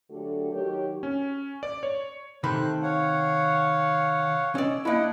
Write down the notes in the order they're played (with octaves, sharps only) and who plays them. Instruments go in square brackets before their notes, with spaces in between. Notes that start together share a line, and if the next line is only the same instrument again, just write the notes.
[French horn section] D3 F#3 A3 F#4 G4 A4
D#3 F#3 F#4 G4 A#4 C#5
[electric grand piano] C#4
D5
C#5
[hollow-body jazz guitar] C3 D#3 B5 [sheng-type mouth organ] A3 C5 F#6
[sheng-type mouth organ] C#5 F5 F#5
[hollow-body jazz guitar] C#4 D5 [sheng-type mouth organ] D#5 E6
[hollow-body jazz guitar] A#3 E4 [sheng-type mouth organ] D4 D#5 F#5